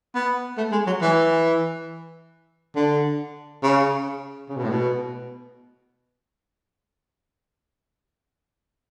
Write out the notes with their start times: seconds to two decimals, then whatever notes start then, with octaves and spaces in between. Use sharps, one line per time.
0.15 B3
0.57 A3
0.72 G#3
0.87 F#3
1.02 E3
2.76 D3
3.63 C#3
4.49 C#3
4.57 B2
4.64 A2
4.70 B2